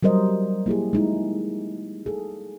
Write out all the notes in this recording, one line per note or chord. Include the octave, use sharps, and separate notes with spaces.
F#3 G3 A#4 C5 D#5
A#3 E4 G4 G#4
G#3 D#4 E4
G#4 A4